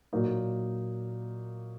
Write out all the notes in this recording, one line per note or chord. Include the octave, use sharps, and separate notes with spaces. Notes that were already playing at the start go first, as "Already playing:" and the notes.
A#2 F#3 A#3 D#4